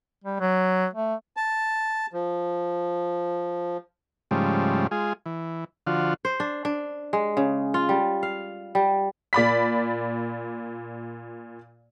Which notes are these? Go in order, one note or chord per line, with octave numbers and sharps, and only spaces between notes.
G3
F#3
A3
A5
F3
G#2 C#3 F3 G3 A3
G#3 F4 G#4
E3
D3 F3 F4 F#4
C5
D4
D4
G#3
C#3
F4
G3
F5
G3
A#2 D5 B5 B6